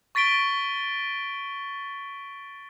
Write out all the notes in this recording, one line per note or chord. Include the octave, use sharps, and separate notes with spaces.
C#6 A6 B6 D7 G7